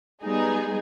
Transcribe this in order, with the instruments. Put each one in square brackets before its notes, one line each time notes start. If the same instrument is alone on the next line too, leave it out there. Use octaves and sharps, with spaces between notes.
[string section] G3 G#3 B3 D#4 G#4